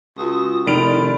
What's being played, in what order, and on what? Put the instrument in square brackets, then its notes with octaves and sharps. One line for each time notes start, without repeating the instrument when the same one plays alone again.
[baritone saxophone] C#2 [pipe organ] F4 F#4 D#6
[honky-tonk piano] F1 D7 F7 [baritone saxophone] D#3 [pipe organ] E4 D5